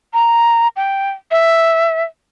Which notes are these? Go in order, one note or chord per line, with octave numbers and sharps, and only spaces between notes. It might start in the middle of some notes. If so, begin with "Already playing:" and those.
A#5
G5
E5